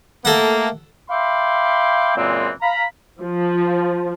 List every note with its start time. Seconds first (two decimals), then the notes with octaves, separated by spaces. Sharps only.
0.25 A3 A#3 A4 F#5
1.10 E5 F5 G5 B5 C6 D6
2.16 F#2 A#2 E3 G#3 C4
2.62 F5 A#5 B5
3.22 F3